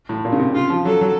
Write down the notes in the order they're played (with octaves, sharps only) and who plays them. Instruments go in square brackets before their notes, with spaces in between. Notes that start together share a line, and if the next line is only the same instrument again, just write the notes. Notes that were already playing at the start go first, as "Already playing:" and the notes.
[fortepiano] A2
A#2
C#3
C3
[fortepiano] C#3 [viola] F4
[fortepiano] F3
[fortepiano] F#3 [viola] A4
[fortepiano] F#3